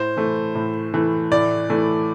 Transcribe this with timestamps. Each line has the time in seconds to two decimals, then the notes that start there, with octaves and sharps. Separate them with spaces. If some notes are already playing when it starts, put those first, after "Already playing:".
Already playing: A2 C5
0.17 E3 A3
0.55 A2
0.94 E3 A3
1.31 A2 D5
1.70 E3 A3